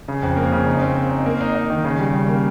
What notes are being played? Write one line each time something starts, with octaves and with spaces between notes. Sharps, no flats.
C#3
F2
A#3
C#3
D#4
C4
C4
D#4
A#3
D#4
D#4
D#3
C#3
G3
C#3
A#3